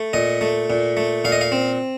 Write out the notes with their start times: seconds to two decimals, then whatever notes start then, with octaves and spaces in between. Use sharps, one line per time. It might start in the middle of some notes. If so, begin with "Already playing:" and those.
Already playing: A3
0.13 A#2 D#5
0.41 A3
0.70 A#2
0.97 A3
1.24 A#2 F5
1.32 D#5
1.41 F5
1.52 C4